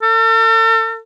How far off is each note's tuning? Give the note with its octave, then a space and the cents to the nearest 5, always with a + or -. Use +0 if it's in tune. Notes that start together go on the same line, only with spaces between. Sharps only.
A4 +45